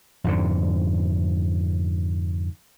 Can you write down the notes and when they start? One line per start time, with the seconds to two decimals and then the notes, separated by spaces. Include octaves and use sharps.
0.24 F2 G#2 D3